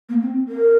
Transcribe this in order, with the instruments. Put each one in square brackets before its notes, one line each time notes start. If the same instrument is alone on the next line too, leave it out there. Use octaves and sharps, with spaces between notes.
[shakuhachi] A#3
C4
A#4